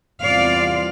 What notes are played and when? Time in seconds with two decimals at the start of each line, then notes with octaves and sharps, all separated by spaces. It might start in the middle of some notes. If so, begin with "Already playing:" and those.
0.23 E2 C3 G3 C4 F4 D5 F5